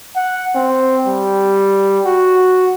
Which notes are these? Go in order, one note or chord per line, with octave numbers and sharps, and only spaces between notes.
F#5
C4
G3
F#4